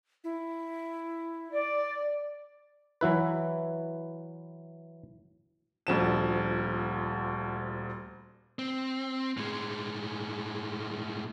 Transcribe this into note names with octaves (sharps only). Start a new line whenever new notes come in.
E4
D5
E3 F#3 E4 B4
D#1 D2 F3 E7
C4
A2 G#3